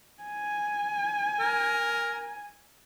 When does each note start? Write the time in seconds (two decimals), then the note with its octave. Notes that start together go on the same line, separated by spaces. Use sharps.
0.23 G#5
1.40 A#4